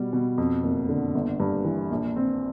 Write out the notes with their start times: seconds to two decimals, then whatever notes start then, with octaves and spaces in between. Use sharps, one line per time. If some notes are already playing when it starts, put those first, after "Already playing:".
Already playing: B2 G3
0.13 B2
0.38 F2
0.64 F#1
0.89 D3
1.15 G1
1.40 G2
1.64 E3
1.91 A#1
2.16 C4